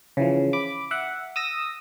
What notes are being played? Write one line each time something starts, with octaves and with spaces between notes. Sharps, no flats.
C#3 E3 F3
B5 D6
E5 F#5
D#6 E6 A#6